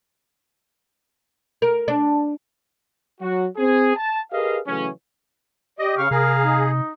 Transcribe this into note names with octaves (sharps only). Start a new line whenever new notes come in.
A#4
D4
F#3 F#4
C4 G#4
A5
G4 G#4 A#4 B4 D#5 F5
C#3 E3 F#3 A3 C#4
G4 D5 D#5
C#3 F5 C#6 F6
C3 G#4 A#4 F5 A#5
D#4